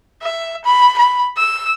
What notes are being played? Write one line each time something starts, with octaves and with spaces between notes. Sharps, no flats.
E5
B5
B5
E6